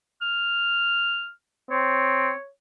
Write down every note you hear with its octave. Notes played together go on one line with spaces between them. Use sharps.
F6
C4 C#5